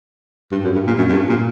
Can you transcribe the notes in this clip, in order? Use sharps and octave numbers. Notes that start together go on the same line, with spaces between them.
G2
F#2
G2
A#2
F#2
F#2
G2
A#2